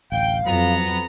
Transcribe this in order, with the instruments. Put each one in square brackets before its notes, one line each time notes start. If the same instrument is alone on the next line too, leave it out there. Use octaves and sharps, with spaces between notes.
[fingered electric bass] D1 A1 [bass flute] F5 [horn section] G5
[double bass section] F2 [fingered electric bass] F#3 [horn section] B3 A#5